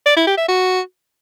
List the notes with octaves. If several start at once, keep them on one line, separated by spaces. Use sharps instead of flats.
D5
E4
G4
E5
F#4